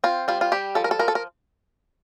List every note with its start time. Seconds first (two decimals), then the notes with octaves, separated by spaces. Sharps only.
0.04 C4 F4
0.28 G3 F4
0.41 F4
0.52 G3 G4
0.75 F3 A4
0.84 A#4
0.91 A4
0.99 F3 A#4
1.08 A4
1.15 A#4